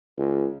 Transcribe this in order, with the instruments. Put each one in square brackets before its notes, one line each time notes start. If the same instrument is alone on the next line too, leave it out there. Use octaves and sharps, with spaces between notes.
[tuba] C#2